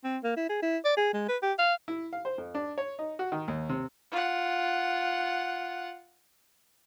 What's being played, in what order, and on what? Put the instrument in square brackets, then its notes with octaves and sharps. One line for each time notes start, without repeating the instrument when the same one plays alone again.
[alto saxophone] C4
A#3
E4
G#4
E4
D5
G#4
G#3
B4
G4
F5
[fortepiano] E4
F5
C5
F2
D4
C#5
D#4
F#4
D#3
D#2
C3
[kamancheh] F4 F#5